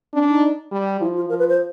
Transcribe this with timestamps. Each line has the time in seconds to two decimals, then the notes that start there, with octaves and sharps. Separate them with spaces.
0.14 C#4 D4
0.29 D#4
0.72 G3
1.00 F3 E4
1.16 F4
1.29 F3 A#4
1.39 B4
1.49 C5